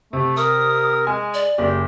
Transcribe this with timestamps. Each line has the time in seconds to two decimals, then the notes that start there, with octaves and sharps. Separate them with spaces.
0.13 C3 A3
0.37 A#4 D#6
1.07 G#3 G#5
1.34 D5
1.58 F#1 G4